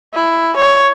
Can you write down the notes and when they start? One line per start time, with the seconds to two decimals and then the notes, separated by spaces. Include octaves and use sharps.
0.14 E4
0.57 C#5